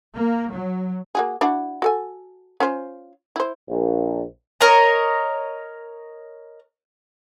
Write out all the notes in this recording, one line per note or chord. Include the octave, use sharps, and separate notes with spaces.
A#3
F#3
A#3 F#4 G#4
D4 E4 F#4
F#4 A4 G#5
C#4 F4 C5
E4 C5
A#1
A#4 C#5 D#5 A#5